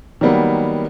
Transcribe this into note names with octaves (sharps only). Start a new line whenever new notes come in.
D#3 F#3 G3 A#3 B3